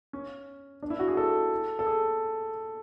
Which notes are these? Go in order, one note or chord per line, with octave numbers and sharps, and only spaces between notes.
C#4
D4
E4
F#4
G#4
A4
A4
G#4